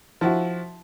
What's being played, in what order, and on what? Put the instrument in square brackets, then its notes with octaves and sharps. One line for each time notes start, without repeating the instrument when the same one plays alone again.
[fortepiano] F3 E4 F#4